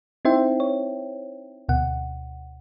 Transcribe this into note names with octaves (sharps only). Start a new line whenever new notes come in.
C4 D#4 E4 C5 E5 G5
C#5
D2 B2 F#5